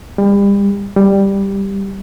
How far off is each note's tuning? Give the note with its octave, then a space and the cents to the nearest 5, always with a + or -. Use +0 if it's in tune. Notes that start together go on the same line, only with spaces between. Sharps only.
G3 +35
G3 +5